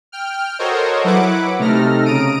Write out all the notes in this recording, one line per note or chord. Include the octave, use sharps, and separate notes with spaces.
G5 F6
F#4 A4 A#4 C5 C#5 D#5
F#3 E4 B4 F#5 D6
C3 A3 D#4 A4 F6 A#6
C#3 A#5 D#6 D7 D#7